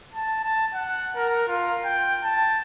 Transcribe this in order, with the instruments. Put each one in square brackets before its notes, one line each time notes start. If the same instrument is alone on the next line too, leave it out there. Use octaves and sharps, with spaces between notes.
[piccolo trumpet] A5
A5
F#5
A#4
F4
G5
A5